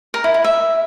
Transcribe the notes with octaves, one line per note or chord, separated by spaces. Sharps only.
A#4
E4
E4
E5